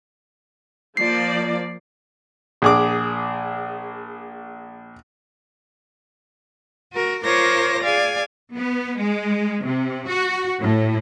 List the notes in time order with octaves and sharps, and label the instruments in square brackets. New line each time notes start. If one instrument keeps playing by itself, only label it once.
[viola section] F3 A#3 D5 [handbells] C7
[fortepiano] A#1 G#4 D6
[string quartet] F#4 A#4
F4 A#4 C5 C#5 D6 A#6
G#4 D5 F5 G#5
[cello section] B3
G#3
C3
F#4
A2